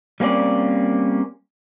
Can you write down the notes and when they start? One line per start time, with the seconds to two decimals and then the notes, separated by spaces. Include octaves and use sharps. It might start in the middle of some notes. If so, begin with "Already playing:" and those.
0.20 G3 A#3 C4 C#4 D5